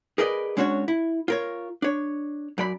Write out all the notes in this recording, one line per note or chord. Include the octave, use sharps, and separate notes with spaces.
G#4 A#4 B4 D5 D#5
G#3 C#4 D4 F#4 C5 C#5
E4
F4 A#4 C#5
D4 C#5
F#2 D5 B5